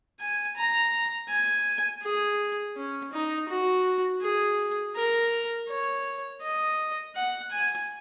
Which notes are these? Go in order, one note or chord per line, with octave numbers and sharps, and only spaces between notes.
G#5
A#5
G#5
G#4
C#4
D#4
F#4
G#4
A#4
C#5
D#5
F#5
G#5